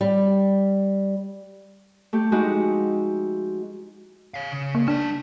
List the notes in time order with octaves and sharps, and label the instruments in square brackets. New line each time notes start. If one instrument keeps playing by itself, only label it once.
[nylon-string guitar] G3
[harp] A3 G4
F3 G#3 D#4 E4 F#4 G4
[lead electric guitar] C#5 F5
C#3
[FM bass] A#3
[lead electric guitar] G#3 A5 [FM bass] D4